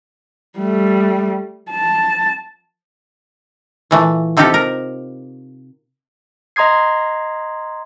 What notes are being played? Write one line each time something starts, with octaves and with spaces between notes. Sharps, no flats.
G3 A3
A5
A#2 E3 A3
C3 C4 D#4 F4 G4 A4
A#4
D#5 A#5 C6 D#6 G#6 C7